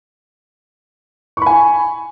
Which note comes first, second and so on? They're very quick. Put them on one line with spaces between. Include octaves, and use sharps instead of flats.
C#6 B5 G#5